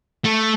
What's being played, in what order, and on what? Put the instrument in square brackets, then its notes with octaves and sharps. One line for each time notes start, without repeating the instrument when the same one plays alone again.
[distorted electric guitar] A3